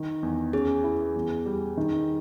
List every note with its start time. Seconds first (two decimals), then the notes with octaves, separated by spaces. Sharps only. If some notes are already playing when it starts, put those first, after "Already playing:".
Already playing: D#3
0.23 E2
0.53 C#4 G#4
0.84 E4
1.16 E2
1.46 G3
1.77 D#3